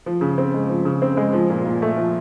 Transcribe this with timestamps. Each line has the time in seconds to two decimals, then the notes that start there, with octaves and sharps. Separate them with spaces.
0.06 F3
0.21 C#3
0.38 C4
0.54 G#3
0.69 F3
0.85 C#3
1.02 C4
1.17 G#3
1.33 F3
1.50 A#2
1.65 A#2
1.82 A3
1.97 F3